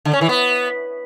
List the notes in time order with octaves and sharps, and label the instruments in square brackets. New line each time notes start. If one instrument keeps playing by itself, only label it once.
[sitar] D3
C#4
E3
B3